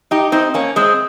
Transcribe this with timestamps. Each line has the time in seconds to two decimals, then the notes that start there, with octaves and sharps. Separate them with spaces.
0.11 D#4 G4
0.32 C4 D#4
0.54 A#3 C#4
0.76 G#3 C4